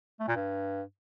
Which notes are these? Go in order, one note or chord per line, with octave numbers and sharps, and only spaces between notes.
A3
A#2
G2